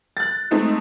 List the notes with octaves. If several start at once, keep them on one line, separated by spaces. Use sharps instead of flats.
F#6 A6
G#3 A3 C4 D#4